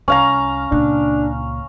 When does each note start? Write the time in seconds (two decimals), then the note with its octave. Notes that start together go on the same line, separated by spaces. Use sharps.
0.08 C2 C#4 F5 A#5
0.72 C#2 A#2 D4